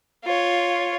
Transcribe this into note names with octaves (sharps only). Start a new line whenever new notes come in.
F4 C#5